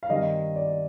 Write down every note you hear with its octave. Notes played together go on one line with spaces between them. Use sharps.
F5
G2 D#3 G3 C4 D#5
D5